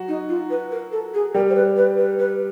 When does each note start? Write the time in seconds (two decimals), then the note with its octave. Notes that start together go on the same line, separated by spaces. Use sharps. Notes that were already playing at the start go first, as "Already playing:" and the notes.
Already playing: F#3 F#4
0.08 D#4
0.29 F4
0.50 B4
0.71 A#4
0.92 A4
1.14 G#4
1.34 G3 G4 A#4
1.49 C5
1.56 B4
1.77 B4
1.97 B4
2.19 B4